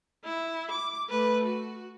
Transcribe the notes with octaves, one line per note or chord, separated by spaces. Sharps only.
E4
D6
A3 B4
F#4